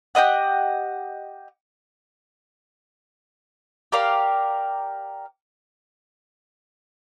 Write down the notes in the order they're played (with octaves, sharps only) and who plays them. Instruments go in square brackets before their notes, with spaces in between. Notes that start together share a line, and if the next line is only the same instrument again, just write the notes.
[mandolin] G4 B4 D#5 F#5
G4 A#4 D5 F5